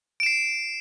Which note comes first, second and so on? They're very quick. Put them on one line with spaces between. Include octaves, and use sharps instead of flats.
D7 E7 C7